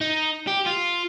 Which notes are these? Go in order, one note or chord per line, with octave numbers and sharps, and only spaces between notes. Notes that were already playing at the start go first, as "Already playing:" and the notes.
D#4
G4
F4